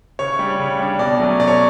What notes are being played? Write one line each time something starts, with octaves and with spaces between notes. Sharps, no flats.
C#3 C#5
G3 D4
C#3
G3 D4
B2 D5
F#3 A3 C#4
B2 D5
C#5